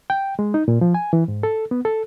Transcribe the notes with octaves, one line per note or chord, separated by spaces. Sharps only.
G5
G#3
D#4
A#2
F3
G#5
E3
G#2
A4
B3
A4